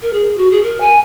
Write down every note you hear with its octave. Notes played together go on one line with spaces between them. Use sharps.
A#4
G#4
F#4
G#4
A#4
G#5